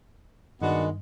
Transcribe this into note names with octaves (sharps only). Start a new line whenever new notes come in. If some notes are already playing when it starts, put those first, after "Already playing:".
G2 D#3 G#3 B3 D4 F#4